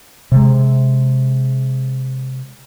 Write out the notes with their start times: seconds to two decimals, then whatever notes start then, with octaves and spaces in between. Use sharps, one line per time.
0.32 C3 G#3